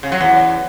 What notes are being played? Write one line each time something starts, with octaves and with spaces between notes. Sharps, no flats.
C#3
F#3
E2